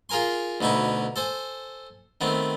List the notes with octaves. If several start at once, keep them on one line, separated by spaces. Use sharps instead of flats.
F4 G#4 A#4 G#5 C6
D2 B2 D#4 E4 C#6
A4 C5 G#5
D#3 A3 B3 C4